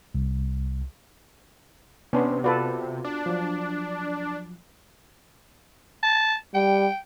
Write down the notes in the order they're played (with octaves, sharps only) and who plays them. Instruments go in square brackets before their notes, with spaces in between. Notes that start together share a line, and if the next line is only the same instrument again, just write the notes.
[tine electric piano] C2
[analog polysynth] C3 [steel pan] B3 [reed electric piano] C#4 D4 C6
[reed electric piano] F4 F#4 [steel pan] A4 B4 D5
[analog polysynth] D4
[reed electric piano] F3 F#3
[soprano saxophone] A5
[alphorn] G3 [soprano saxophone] G5